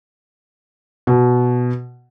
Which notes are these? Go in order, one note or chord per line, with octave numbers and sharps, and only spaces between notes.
B2